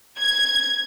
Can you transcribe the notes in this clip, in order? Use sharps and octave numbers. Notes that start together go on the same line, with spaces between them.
G#6